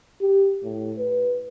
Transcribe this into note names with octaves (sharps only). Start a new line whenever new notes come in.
G4
A2
B4